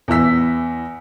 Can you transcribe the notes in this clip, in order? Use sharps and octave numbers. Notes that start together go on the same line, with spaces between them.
E2 E3 E4 E6 B6